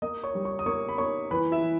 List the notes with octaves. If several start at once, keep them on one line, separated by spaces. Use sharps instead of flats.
A#3 D#5 D#6
C#5 C#6
G3
C#5 C#6
D#6
A#3 C#5 C#6
B5
A#3 C#5 C#6
E3 B4 B5
E4 E5
E3